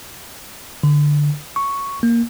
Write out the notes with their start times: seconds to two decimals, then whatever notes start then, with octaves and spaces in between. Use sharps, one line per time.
0.83 D3
1.56 C#6
2.03 A#3